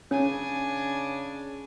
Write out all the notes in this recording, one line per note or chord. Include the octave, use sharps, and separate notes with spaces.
C#3 C#4 D4 G#5